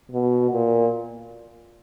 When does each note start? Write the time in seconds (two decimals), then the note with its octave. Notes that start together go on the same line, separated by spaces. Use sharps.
0.12 B2
0.51 A#2